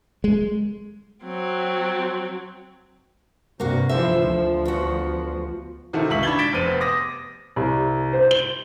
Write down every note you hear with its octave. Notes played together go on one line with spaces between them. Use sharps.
G#3
F#3 C4
G2 C3 A#3 F#4
G1 E3 F3 C5 E5
D2 F3
E2 F#4
C3 D#3 E4 F#4 A4
C#2 E3 E5 C#6 B6 F#7
D4 B5 G#6 A6 G7
A6 B6 D7 E7
F1 B3 C4 D#7
D6 D#6 A#6
C2
C5
G7